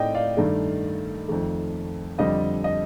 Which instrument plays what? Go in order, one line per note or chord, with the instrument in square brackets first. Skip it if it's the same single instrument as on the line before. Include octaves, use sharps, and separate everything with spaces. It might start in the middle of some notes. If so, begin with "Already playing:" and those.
Already playing: [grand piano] A2 A3 C4 D#4 D5 D#5 G5
D5 F5
G2 D#3 A3
F2 D#3 A3
F2 D3 G3 D#5
D#5